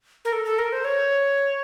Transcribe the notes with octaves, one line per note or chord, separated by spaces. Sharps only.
A#4
A4
A4
A#4
C5
C#5